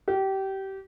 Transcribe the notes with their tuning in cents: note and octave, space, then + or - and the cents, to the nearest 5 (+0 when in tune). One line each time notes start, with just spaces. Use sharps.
G4 -25